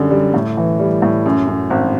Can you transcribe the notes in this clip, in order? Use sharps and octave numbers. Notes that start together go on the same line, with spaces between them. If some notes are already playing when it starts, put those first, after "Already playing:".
Already playing: F#2 D3 G3
G3
A2
E3
G3
A2
F#2
F#2
G#1